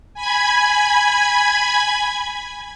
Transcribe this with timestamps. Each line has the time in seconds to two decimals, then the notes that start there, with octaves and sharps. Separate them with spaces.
0.14 G#5 B5 G#6